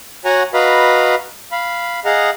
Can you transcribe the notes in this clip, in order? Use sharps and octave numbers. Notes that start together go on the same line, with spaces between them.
F#4 C#5 F#5 G#5 A#5
F#4 B4 D#5 F5 A#5 B5
F5 B5
G#4 D#5 F5 F#5 A#5